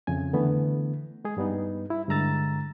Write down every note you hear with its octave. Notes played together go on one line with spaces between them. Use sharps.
F2 C#3 G#5
D3 E3 A3 B3
G#3 G#4
G2 G3 B3 D#4
E4
G2 D3 G#3 A#5 E6 A6